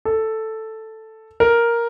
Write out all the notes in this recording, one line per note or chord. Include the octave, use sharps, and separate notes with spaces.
A4
A#4